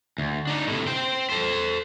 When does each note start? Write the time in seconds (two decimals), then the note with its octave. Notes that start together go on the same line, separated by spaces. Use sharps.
0.18 D2
0.47 D4 D#4
0.67 A2 C3
0.87 C5 G5
1.29 A4 C5